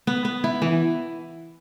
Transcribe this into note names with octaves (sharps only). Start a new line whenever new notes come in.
B3
B3
E4
E3